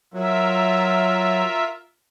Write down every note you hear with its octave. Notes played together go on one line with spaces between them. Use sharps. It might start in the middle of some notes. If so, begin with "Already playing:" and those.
F#3 F4 A#4 E5